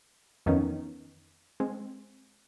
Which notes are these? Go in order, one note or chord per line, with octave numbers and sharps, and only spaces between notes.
F2 D#3 E3 B3 C#4 D#4
G#3 C4